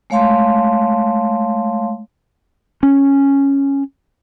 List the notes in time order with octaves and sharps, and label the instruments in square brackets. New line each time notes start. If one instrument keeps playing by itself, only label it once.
[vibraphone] G#3 A3 C#5 F5 A5 C6
[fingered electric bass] C#4